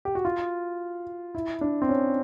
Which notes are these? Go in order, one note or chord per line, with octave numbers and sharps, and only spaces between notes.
G4
F#4
F4
E4
D4
C4
C#4